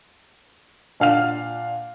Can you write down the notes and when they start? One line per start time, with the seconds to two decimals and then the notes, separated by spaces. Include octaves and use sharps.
1.00 A#2 D4 F5 F#5 F6 F7